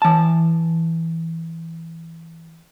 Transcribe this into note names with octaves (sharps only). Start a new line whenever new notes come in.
E3 A5